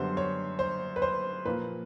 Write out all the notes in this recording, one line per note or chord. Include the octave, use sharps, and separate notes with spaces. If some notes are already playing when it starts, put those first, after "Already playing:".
Already playing: F#2 D3 G3 B3 C5
C#5
C5
B4
C5
A#2 F3 A#3 B4